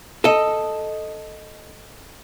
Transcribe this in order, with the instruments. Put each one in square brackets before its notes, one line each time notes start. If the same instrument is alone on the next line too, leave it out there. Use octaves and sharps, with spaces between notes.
[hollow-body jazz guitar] A4 D#5